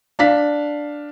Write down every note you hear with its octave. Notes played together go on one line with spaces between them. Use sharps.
D4 F5 B6